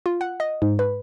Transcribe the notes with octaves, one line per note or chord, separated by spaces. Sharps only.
F4
F#5
D#5
G#2
B4